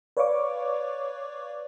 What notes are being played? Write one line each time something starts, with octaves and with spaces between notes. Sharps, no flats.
B4 C#5 D5 F5 C#6 D6